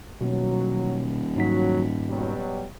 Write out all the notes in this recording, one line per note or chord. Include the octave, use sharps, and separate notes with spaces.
D#1 B2 F#3
G#2 F#3 D#4 B6
B2 F#3 G3